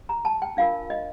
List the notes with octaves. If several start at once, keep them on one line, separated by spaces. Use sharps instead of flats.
A#5
A5
G5
D4 F4 A#4 F5
D#5